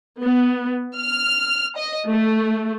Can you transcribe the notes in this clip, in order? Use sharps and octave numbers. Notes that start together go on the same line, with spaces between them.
B3
F6
D#5
A3